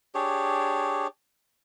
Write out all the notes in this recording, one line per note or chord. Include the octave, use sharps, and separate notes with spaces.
D4 G4 G#4 C#5